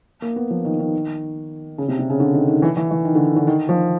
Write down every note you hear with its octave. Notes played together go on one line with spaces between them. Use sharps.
A#3
B3
F3
D#3
D#3
C#3
C3
C3
C#3
D3
D#3
D#3
E3
E3
E3
D#3
D3
D3
D#3
F3